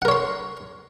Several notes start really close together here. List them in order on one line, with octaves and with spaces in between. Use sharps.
F#5 A#4 C#5 C6